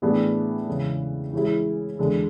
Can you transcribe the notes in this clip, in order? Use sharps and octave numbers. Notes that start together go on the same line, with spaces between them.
A2 E3 B3 D4 G#4
E2 C#3 E3 G#3
E3 G#3 C#4 E4 G#4
E2 D3 G#3